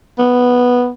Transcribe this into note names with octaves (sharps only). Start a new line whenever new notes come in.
B3